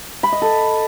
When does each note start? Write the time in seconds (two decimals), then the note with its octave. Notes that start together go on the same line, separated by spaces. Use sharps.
0.23 B5
0.33 D#5
0.42 A4